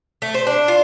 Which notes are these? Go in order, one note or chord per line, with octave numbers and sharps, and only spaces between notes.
A3
C5
D4
F4